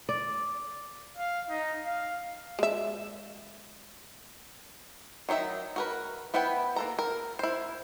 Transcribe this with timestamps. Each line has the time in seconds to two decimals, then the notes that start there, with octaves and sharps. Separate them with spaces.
0.09 D5
1.18 F5
1.50 D#4
1.86 F5
2.59 G#3 E5
5.29 D#3 F#3 D#4 E5
5.76 F#4 A#4 B4
6.34 B3 E4 B4 F#5 G5
6.76 A#3 A4 A#5
6.99 A#4
7.39 E4 C5